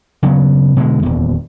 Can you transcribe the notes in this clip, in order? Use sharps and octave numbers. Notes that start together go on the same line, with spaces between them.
C#3 F#3 B3
B2 D3 G#3
D#1 E2